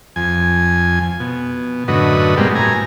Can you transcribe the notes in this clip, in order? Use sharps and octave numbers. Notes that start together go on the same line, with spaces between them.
F2 G#5
B2
F#2 A2 D3 F#4 B4 D#5
G2 B2 G#3 A#3 C4 G4
A2 G#5 A#5